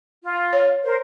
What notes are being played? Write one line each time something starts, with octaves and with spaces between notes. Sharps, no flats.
F4
C#5
A#4 C5